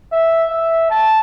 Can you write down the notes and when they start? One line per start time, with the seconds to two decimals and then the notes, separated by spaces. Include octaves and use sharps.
0.12 E5
0.50 E5
0.91 A5